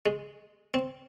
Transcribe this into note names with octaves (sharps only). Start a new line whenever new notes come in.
G#3
C4